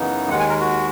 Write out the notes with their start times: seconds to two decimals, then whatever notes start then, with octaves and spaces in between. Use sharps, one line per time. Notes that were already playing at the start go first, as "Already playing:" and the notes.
Already playing: F#2 C#3 E3 B3 D#4
0.29 D#2 D#3 G#3 F#5
0.40 G#5
0.49 A#4
0.60 F#4